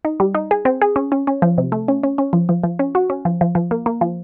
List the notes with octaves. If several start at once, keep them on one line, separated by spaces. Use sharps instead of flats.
D#4
G3
D#4
G#4
C4
G#4
C#4
C#4
C#4
F3
C3
A3
C#4
C#4
C#4
F3
F3
F3
C#4
F#4
C#4
F3
F3
F3
A#3
A#3
F3